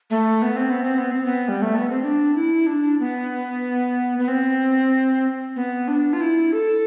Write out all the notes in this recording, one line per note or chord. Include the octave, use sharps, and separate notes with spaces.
A3
B3
C4
B3
C4
B3
C4
B3
G3
A3
B3
C4
D4
E4
D4
B3
B3
C4
B3
D4
F4
E4
A4